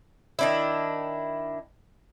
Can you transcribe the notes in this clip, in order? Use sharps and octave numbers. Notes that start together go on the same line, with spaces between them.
D#3 D4 E4